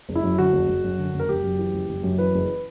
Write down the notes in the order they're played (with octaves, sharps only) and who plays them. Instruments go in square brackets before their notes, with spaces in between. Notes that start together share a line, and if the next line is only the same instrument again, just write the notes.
[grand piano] F#1
E4
F#2
D3 F#4
F#1
F#1
F#2
D3
F#1
A#4
F#1 G4
F#2
E3
F#1
F#1
F#2
E3 B4
F#1